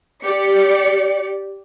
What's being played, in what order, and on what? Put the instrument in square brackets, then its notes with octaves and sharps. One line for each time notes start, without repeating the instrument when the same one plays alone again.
[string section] G4 D5 C#7